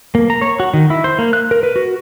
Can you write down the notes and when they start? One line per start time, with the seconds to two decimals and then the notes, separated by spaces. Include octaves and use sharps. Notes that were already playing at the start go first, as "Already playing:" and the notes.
0.15 A#3
0.30 A#5
0.41 C#5
0.60 F#4
0.74 D#3
0.90 E4
1.04 C5
1.19 A#3
1.33 F#6
1.51 A#4
1.63 B4
1.76 F#4